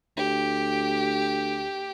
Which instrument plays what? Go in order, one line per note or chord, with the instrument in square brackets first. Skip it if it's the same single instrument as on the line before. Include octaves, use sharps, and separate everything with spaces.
[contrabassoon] D2 [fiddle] G4